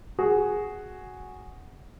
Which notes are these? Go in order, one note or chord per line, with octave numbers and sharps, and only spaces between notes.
F#4 G#4